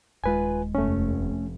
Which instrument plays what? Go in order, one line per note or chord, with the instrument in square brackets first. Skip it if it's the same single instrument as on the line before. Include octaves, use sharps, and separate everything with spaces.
[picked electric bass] D#1 G#3 [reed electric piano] F4 B4 G#5
[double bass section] F1 [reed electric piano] A3 C#4